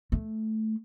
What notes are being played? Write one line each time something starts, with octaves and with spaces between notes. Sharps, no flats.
A3